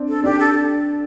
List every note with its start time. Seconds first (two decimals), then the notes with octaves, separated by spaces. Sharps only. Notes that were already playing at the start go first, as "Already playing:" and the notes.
Already playing: C4 D4
0.09 A4
0.24 D4 G4
0.40 A4